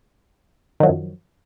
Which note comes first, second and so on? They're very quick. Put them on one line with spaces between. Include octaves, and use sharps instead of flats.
D#3 F#3 F3 F#2